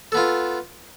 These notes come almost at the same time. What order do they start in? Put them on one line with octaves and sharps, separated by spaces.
A4 B3 F4